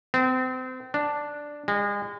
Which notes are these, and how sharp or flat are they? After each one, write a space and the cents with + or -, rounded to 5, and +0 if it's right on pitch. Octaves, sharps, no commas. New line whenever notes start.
C4 -30
D4 +0
G#3 -35